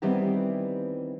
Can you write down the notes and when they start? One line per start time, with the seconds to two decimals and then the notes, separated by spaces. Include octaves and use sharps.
0.02 D#3 E3 G3 B3 C4 C5